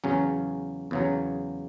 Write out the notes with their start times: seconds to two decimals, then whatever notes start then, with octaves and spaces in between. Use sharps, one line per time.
0.04 E2 C#3 F#3 C#4
0.91 E2 C#3 F#3